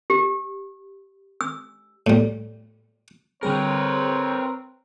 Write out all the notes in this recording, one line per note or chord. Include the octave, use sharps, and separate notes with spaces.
G4
E6
A2 G3
D3 G3 C4 G#4 A#4 B4 C#5